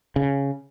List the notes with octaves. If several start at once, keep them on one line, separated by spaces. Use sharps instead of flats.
C#3